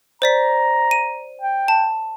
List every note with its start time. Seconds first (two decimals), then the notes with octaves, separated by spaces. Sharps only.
0.22 C5 D5 A#5 B6
0.91 D#7
1.41 G5
1.68 A5